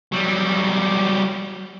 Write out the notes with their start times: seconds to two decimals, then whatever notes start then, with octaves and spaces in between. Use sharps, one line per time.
0.12 F#3 G3